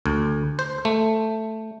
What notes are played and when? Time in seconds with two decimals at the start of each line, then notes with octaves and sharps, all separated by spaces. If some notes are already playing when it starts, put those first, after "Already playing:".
0.06 D2
0.59 C5
0.85 A3